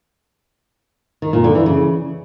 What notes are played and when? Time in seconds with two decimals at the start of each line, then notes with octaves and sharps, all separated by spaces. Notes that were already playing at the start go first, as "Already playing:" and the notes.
1.22 D#3
1.33 A#2
1.44 D3
1.55 E3
1.66 C#3